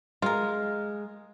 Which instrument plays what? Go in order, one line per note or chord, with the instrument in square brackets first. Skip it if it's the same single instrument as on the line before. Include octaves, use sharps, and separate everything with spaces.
[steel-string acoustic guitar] G#3 [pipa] F4 A#4